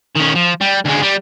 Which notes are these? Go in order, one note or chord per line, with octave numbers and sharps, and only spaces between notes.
D#3 C#4
F3
G3
D2 G#3
G3